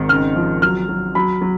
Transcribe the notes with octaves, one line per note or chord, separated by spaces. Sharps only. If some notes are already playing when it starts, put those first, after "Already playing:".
Already playing: G#1 D#3
C#3 F6
F3
F#3 F6
F#3
F#3 B5
F#3